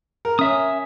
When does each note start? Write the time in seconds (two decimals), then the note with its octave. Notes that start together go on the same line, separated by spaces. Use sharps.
0.25 A#4
0.39 C#4 E5 D#6